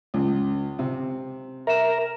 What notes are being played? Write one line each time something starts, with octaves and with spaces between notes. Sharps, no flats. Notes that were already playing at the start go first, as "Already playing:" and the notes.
C#2
C3
A#4 E5 E7